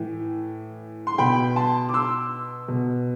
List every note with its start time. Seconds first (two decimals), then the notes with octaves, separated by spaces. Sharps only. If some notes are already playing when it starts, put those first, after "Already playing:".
Already playing: A2 E3
1.07 C6
1.18 B2 G5 B5
1.56 A5 C6
1.89 D6
1.94 C6 E6
2.68 B2